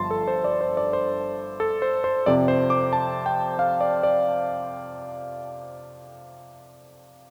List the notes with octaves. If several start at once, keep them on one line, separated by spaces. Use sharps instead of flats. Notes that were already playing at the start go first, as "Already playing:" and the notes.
Already playing: G1 G2 F3 A5 C6
A4
C5
D5
C5
D5
C5
A4
C5
C5
F2 C3 F3 C4 D5
C5
D6
A5
G5
F5
D5
D5